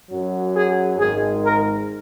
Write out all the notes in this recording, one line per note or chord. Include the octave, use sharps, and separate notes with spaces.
F#2 F#3
G#4
G#1 G#2 D#3 G#3 G#4
A#4